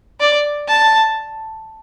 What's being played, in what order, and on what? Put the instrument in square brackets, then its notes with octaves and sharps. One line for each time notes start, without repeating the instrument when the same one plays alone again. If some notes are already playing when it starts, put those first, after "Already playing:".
[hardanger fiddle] D5
A5